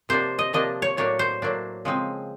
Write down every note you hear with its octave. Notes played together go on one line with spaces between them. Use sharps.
C3 F3 A#3 D4 C5
D#5
C3 F3 A#3 D4 D#5
C#5
A2 F#3 A#3 D4 C#5
C5
A2 F#3 A#3 D4
C#3 F3 G#3 C4